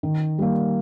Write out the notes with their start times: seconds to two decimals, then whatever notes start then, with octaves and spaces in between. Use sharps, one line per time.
0.03 D#3
0.38 G3 A#3